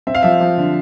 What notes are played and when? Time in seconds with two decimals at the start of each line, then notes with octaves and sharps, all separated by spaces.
0.07 C4 E5
0.15 F5
0.23 F3 E5
0.41 F3
0.58 D3